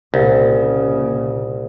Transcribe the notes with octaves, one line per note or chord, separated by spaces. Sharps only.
C2 A#2 C#3